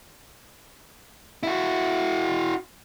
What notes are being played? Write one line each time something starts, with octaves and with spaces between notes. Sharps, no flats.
E4 F#4